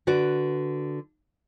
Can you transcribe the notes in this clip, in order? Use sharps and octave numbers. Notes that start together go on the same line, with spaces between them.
D3 F#4 B4 D5